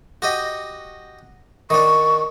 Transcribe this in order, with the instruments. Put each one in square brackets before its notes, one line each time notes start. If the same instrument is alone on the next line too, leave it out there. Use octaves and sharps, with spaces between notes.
[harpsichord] F#4 G4 D#5
[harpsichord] D#3 D4 [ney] C#6